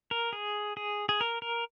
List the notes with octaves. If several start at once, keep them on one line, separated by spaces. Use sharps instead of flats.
A#4
G#4
G#4
G#4
A#4
A#4